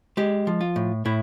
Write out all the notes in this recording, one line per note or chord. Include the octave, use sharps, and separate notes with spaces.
G#3 G4
F3
F4
A2
A2 E4